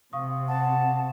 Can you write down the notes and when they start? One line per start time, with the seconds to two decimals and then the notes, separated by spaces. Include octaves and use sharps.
0.13 C3 F5 C#6 D#6
0.48 F#5 A5